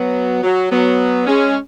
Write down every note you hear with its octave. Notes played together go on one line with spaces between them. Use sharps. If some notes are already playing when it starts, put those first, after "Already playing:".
Already playing: F#3 B3
F#3
F#3 B3
G#3 C#4